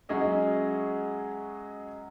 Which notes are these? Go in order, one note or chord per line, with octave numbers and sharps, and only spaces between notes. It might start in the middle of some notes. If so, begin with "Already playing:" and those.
F#3 G#3 C#4 G#4 D#5 E5